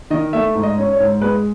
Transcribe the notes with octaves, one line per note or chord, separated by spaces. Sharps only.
D#3 D#5
A3 E5
G#2
D#5
C#4
C#5
G#2
G#3 B4